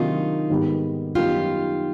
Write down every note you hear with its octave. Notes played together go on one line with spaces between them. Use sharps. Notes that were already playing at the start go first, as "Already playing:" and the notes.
Already playing: C3 D#3 F#3 A#3 D4 D#4 F4
G#2 D#3 G3 B3
F#2 D#3 G3 B3 D#4 F4 G4